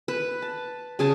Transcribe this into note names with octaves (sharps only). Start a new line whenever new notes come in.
B4
A5
C#3 G#4 G#5 A5